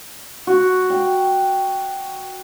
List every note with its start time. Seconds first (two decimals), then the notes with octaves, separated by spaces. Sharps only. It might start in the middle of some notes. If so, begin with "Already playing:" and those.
0.47 F#4
0.90 G5